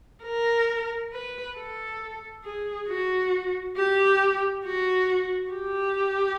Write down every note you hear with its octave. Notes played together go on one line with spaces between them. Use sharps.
A#4
B4
A4
G#4
F#4
G4
F#4
G4